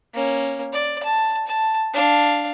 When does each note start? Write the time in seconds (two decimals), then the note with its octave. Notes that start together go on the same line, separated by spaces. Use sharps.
0.14 A#3 C#4
0.73 D5
1.03 A5
1.47 A5
1.94 D4 F5